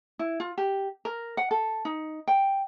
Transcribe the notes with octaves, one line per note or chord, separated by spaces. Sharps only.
E4
F4
G4
A#4
F#5
A4
D#4
G5